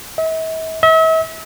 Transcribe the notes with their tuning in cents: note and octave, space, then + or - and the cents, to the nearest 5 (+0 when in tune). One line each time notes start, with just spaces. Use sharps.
E5 -45
E5 -40